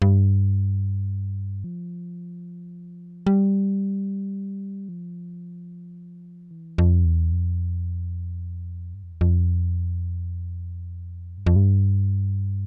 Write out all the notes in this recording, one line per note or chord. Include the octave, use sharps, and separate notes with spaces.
G2
F3
G3
F3
E3
F2
E2
F2
G2
F2
E2
F2
G2
F2
G2